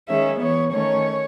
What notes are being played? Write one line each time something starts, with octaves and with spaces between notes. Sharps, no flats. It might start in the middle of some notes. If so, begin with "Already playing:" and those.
D#3 G#3 C#4 E5
E3 B3 C#5
D#3 A3 C#4 C#5